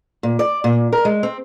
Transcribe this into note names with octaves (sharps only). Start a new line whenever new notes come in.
A#2
D5
A#2
A#4
G#3
C4